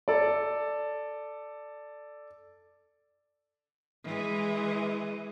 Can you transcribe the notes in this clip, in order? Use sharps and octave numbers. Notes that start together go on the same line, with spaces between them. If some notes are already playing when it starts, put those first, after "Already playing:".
A4 D5
E3 G#3